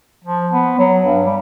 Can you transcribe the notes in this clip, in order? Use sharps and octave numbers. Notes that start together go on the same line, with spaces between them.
F3
B3
F#3
G2
G3